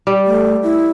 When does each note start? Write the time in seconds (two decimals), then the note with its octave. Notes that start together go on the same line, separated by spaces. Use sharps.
0.07 G3
0.26 A3
0.63 E4